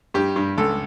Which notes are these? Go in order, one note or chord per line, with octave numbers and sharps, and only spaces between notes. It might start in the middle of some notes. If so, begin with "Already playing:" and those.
G2 G4
G2
C#2 A4